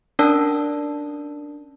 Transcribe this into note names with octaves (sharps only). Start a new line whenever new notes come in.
C#4 D4 A#4 D5 A5 E6